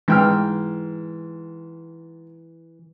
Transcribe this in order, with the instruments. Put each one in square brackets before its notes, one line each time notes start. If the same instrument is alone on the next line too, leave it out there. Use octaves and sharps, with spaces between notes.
[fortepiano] G#2 G5 F6 [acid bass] E3